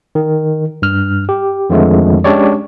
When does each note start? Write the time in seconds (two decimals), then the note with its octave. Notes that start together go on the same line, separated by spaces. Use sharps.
0.15 D#3
0.82 G2 F6
1.29 G4
1.70 F2 D3 D#3 F3 G#3 A3
2.24 G#3 C#4 D4 G4 C#5 D5